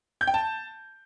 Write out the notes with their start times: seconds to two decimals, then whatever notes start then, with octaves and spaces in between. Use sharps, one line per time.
0.21 G6
0.27 G5
0.34 A5